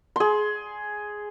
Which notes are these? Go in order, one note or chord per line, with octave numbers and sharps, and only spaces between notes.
G#4 C6